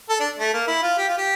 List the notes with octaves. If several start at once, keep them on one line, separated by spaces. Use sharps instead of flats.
A4
D4
A3
A#3
E4
F4
G4
F4
G4